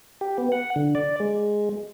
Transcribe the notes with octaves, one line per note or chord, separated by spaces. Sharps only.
G4
B3
F#5
D3
D5
G#3